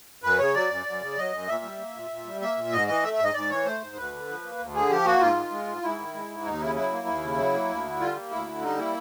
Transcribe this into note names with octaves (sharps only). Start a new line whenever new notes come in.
F#2 B4
C#3 C#5
F#3 D5
F#2
F#2
C#3
F#3 D#5
F#2
A#2 E5
G3
A#3
A#2
A#2
G3
A#3 E5
A#2
G#2 D#5
E3 D#5
A3 E5
E5
G#2 D#5
G#2 D5
E3 C#5
A3 C5
G#2
D2 B4
D3
F3
A#3
D2
D3 G#4
F3 G4
A#3 F#4
G#2 F4
D#3
G#3
G#2
G#2 E4
D#3
G#3
G#2
D#2 D#4
C#3 E4
F#3 E4
A#3
D#2
C#3
F#3
A#3
D2
D3
G3 F4
A#3
D2 E4
D3
G3 D#4
A#3 E4